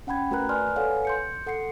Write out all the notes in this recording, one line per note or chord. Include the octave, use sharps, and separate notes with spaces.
C#4 F#5 G5 B5 G#6
A3 F#4 A#4 B4 A#5 F#6
B4 D5 G#5 C6 F6
A4 B4 C#5 F5 F#5 G#5
C6 G6 C#7
A4 F#5 C6 C7 C#7